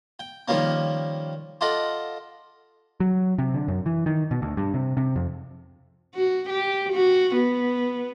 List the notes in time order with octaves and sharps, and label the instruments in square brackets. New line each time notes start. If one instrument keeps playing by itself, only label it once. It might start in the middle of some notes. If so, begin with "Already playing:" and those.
[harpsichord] G5
D#3 F3 G3 A#3 C#4
F4 A4 D#5 F#5 D6
[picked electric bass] F#3
C3
D3
F#2
E3
D#3
B2
D2
G2
C3
C3
F2
[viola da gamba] F#4
G4
F#4
B3